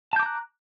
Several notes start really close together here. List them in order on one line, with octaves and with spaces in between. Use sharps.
A5 G6 D6 A#5 F#6